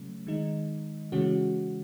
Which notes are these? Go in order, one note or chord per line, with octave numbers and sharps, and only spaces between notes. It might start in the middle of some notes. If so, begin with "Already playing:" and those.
Already playing: C#3 F#3 A3 C#4
D#3 G#3 D#4
C#3 E3 G#3 C#4 F#4